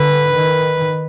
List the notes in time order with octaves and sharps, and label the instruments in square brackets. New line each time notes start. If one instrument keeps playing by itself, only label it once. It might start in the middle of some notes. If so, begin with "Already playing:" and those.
Already playing: [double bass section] D3 [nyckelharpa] B4
[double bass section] D#3